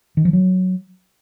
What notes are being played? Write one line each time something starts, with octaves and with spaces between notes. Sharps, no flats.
D#3
F3
F#3